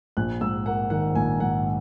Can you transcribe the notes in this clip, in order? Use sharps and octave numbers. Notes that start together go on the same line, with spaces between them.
A#1 F#6
G#2 E6
A#3 F#5
D#3 F#5
A#1 G#5
G#2 F#5